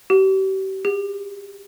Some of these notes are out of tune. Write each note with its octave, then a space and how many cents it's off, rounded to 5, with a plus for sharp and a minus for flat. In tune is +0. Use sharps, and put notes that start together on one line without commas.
G4 -35
G4 +40